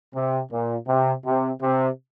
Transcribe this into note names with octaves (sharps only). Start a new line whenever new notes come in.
C3
A#2
C3
C3
C3